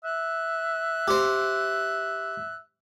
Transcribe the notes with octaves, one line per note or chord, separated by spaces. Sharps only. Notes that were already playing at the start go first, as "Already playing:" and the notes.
E5 F#6
G4 C5